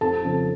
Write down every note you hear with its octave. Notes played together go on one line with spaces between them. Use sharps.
F2 A4 A5
C#3 F3